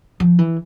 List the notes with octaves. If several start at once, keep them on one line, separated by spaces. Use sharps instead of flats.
F3
E3